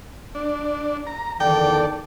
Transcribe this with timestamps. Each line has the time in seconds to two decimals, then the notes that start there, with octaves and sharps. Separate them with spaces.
0.35 D4
1.07 A#5
1.40 E2 D3 D#3 A4 D5 G5